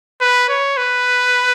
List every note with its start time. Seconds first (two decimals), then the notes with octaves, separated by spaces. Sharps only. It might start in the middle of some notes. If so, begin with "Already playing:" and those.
0.21 B4
0.48 C#5
0.77 B4